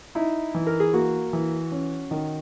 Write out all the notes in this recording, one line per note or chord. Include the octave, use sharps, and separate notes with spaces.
D#4 E4
E3
A#4
G#4
A#3 F#4
E3
C#4
D#3